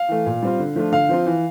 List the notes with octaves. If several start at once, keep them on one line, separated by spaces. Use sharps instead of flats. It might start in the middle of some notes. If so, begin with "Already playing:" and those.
Already playing: F5
E3 A3
A#2
G3 C4 F4
D3
F3 A3 D4 F4
D3 F5
F3 C4 F4
E3